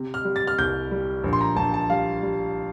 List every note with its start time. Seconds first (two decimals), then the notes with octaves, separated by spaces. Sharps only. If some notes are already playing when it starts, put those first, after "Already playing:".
Already playing: C3
0.14 F6
0.25 G3
0.36 A6
0.47 F6
0.58 C2 G6
0.91 G3
1.24 A#1
1.33 C6
1.41 A#5
1.56 A#1 A5
1.74 A5
1.90 G3 F5
2.23 G3